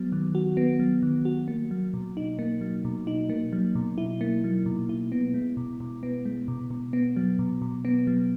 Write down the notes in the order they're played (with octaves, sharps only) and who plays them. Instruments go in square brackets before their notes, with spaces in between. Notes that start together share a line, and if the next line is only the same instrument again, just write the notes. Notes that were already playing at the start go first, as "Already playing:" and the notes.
Already playing: [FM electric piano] F#3 B3
D#3
F#4
B3
F#3
D#3
F#4
A#3
F#3
B2
D#4
A#3
F#3
B2
D#4
A#3
F#3
B2
E4
A#3
F#3
B2
E4
B3
G#3
B2
B2
B3
G#3
B2
B2
B3
F#3
B2
B2
B3
F#3